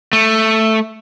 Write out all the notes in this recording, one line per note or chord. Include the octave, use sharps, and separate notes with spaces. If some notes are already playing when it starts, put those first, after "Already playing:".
A3